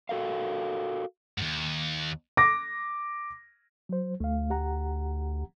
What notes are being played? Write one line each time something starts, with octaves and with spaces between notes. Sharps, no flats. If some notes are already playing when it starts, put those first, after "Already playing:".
F#4 A4 A#4 F5
D#2 G#2
D6 A#6
F#3 C5
D2 A3 F5
G4 F#5 A#5